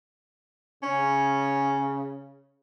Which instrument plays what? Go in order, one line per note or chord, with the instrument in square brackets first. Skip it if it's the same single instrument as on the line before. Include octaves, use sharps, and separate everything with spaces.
[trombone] C#3 [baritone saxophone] C#4